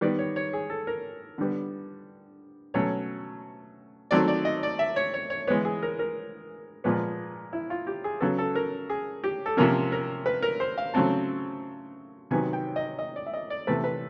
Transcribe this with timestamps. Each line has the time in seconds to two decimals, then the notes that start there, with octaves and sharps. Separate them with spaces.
0.01 D#3 G3 B3 D5
0.19 C#5
0.36 C#5
0.53 G#4
0.70 A4
0.87 A#4
1.38 D3 G3 B3
2.74 B2 F#3 A3 C#4 C#5
4.11 D#3 F#3 A3 C4 D5
4.28 D5
4.45 D#5
4.63 D5
4.79 E5
4.96 C#5
5.14 C#5
5.30 C#5
5.47 E3 G#3 B3 C#5
5.65 G#4
5.83 A#4
5.99 A#4
6.84 A#2 F3 G#3 B3
7.53 E4
7.70 F4
7.87 G4
8.04 G#4
8.21 C#3 F#3 B3 A4
8.38 A4
8.55 A#4
8.90 G#4
9.24 G4
9.46 A4
9.57 C3 F3 A#3 C#4 A#4
9.92 A#4
10.26 B4
10.43 A#4
10.60 C5
10.78 F5
10.94 C#3 F#3 A3 C4 A5
12.31 C3 D#3 F#3 B3 G#5
12.53 G5
12.76 D#5
12.99 D#5
13.16 D5
13.26 E5
13.33 D#5
13.50 D5
13.67 C3 E3 A3 B4
13.84 B4